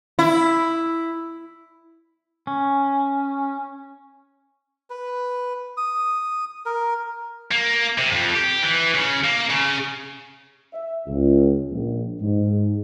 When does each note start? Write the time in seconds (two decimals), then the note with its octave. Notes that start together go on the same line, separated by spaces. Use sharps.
0.19 E4
2.47 C#4
4.90 B4
5.77 D#6
6.66 A#4
7.52 A#3
7.98 C3
8.12 F2
8.35 G4
8.63 E3
8.95 C#3
9.24 A#3
9.50 C#3
10.73 E5
11.07 C#2
11.71 A#1
12.21 G#2